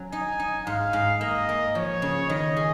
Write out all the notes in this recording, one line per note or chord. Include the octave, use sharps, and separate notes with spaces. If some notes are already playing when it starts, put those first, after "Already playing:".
Already playing: F#3 C#4
D#4 G#5
D#4
G#2 F5
G#2
A#3 D#5
A#3
F3 C#5
C#3
D#3 D#5
G#4